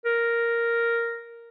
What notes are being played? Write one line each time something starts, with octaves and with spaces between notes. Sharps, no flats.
A#4